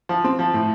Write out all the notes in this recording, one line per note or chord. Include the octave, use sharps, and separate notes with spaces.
F3
C4
F3
A2